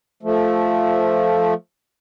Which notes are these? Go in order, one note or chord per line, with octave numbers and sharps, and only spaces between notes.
F3 A3